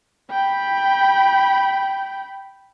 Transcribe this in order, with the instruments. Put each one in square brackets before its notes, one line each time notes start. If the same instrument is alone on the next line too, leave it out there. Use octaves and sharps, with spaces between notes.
[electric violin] G5 B5